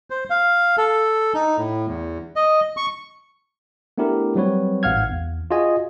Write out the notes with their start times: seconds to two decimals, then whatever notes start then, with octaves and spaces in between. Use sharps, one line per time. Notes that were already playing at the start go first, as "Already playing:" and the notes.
0.10 C5
0.30 F5
0.78 A4
1.34 D#4
1.58 A2
1.87 E2
2.36 D#5
2.77 C#6
3.98 A3 B3 D4 E4 G4 A#4
4.36 F#3 G3 C4 F#4 B4 C#5
4.83 A1 G#2 F5 F#5 F6 G#6
5.11 E2
5.51 F4 F#4 G#4 D#5 G#5